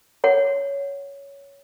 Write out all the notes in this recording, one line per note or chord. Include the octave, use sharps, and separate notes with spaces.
C#5 F#5